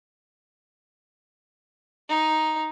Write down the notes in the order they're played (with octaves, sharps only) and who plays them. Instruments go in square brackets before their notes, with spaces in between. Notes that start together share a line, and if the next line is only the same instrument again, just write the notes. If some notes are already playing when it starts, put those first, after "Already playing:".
[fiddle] D#4